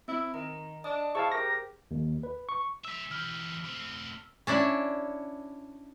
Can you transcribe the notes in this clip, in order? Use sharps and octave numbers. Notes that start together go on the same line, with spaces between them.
C4 E4
D#3 A#5
D4 D#5 D#6
E4 G#4 C5 F5 A5 C#6
G4 A#4 A#6
D#2
B4
C#6
G#3 E5 E6 B6
E3 G4 F6
A3 C4
C#4 D4 E4